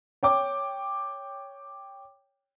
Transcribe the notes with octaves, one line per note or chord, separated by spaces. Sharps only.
C#5 G5 D6